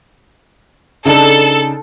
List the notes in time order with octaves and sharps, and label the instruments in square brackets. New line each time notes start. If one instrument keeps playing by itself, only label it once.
[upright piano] C#3 D4 D#4 [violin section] A4